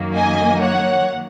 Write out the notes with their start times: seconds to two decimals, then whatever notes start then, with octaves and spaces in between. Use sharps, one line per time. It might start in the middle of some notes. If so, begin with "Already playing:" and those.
Already playing: F#2 D#3 F#3 A#3
0.15 D#5 G#5
0.60 C#5 F#5